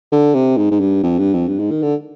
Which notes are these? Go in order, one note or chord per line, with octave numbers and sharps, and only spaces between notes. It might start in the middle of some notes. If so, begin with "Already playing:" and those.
D3
C3
G#2
G#2
G2
F2
G2
F2
G2
G#2
D#3
D3